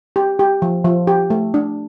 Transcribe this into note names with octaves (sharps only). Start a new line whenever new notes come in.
G4
G4
F3
F3
G4
A3
D4